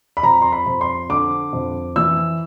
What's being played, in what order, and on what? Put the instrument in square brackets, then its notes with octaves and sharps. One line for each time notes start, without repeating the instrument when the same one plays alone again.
[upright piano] B5
F2 A#5
C6
B5
F2
C6
D3 D6
F2
E3 E6